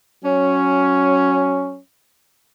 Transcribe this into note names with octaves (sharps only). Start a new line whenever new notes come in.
F#3 C#4